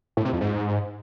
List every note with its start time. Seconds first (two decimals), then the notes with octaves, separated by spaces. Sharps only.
0.17 A2
0.25 C3
0.33 F2
0.41 G#2